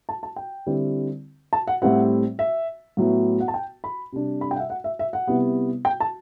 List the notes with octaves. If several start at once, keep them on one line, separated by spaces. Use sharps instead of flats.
A5
A5
G5
D3 G3 C4 E4
A5
F#5
A2 G3 C4 E4 F#5
E5
A2 F#3 B3 E4
F#5
A5
G5
B5
C3 G3 D4
B5
G5
F#5
E5
F#5
E5
E5
F#5
C3 G3 B3 E4
G5
A5